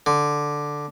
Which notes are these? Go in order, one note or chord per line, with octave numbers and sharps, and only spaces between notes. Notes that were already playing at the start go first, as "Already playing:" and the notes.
D3